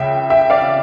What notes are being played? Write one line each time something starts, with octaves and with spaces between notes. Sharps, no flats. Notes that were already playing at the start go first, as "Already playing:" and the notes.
Already playing: C#2 C#3 E5 G5
E5 G5
D5 F5